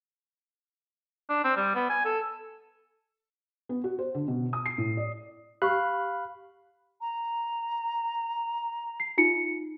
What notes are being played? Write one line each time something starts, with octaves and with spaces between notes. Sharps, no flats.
D4
C4
G3
B3
G#5
A4
B3
F#4
C5
D3
B2
D#6
C7
A2
D5
G4 F5 B5 C#6 F#6
A#5
C7
D#4 F4 C#7